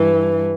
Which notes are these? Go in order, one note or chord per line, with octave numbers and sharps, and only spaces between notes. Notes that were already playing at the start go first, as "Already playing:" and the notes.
Already playing: G2 E3